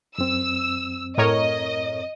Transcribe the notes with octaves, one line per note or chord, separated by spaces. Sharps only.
F#2 C4 E6
A2 A#4 C#5 D#5